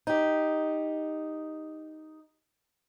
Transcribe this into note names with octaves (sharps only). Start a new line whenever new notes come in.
D#4 G4